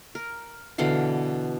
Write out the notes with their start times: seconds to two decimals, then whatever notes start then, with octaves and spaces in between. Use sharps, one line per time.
0.15 A#4
0.78 B2 D3 E3 F5